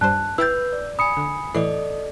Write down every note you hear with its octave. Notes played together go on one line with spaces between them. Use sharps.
G2 G3 C5 A5 F#6
E4 B4 G5 E6 G6 A6
D5
G#5 B5 D#6 C#7
D3
A2 E3 A4 D5 D#5 C7